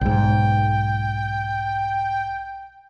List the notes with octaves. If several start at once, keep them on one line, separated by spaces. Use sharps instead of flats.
B1 G#2 G5